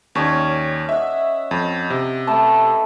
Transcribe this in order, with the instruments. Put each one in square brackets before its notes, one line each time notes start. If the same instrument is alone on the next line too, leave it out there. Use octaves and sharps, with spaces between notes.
[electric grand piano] D#2 [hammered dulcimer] C#4 C#5 D5
[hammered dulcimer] D#5 F#5 [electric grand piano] E5
[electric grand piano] F2
C3
[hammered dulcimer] A3 B4 A5